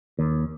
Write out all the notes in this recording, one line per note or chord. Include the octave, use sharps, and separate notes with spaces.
D#2